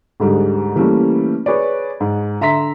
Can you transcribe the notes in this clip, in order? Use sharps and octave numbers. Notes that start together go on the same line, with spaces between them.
D2 G#2 G3 G#3
E3 G3 A3 A#3 C#4
G#4 B4 C#5 D5
G#2
D3 E5 A#5 C6 B6